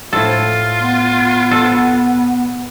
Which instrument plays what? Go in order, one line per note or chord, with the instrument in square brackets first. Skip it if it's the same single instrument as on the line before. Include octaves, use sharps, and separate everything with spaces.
[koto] A2 A4 [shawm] F4
[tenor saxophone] B3
[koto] A4